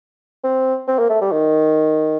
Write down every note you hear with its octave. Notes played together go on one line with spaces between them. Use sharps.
C4
C4
A#3
A3
G3
D#3